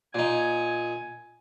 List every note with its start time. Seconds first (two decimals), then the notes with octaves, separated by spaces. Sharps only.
0.14 A#2 D#4 G#5